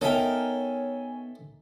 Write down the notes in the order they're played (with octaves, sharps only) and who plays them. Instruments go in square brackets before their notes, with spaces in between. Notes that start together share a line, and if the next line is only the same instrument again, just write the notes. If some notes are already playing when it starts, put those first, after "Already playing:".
[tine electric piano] B3 [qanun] D#4 A#4 [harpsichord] A4 E5 G5 [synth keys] C#5 G#5